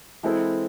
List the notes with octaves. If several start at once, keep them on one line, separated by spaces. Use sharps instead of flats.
E3 G#3 C4 E4 A4